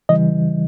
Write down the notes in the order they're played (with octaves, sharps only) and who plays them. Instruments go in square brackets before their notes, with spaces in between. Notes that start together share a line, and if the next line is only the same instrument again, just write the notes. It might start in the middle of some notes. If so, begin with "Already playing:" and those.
[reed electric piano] C#3 E3 G3 D#5